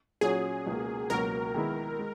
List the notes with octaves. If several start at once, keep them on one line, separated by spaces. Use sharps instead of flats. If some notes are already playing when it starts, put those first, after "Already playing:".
A#2 F#3 C#4 F#4 G#4 C#5
C#2 B2 A#3
C#2 B2 F#3 A#3 A#4
D#3 G#3 B3 E4
G#3